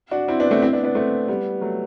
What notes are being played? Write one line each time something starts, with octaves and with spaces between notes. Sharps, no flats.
D4 F#4
C4 E4
B3 D4
A3 C4
C4 E4
B3 D4
B3 D4
A3 C4
G3 B3
F#3 A3